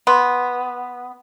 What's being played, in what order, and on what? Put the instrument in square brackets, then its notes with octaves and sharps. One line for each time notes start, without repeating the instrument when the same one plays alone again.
[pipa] B3 [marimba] C6